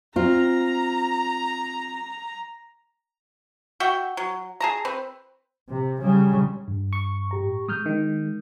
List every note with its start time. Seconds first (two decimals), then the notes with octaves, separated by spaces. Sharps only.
0.16 C4 F4 A#5
3.80 F#4 E5 F#5 G5
4.17 F#3
4.60 G#4 A5 A#5
4.85 C4 B4
5.69 C3
6.01 C#3 G3
6.68 G2
6.93 C#6
7.31 A2 G4 A#5
7.69 G#3 D#6 F6 G6
7.86 D#3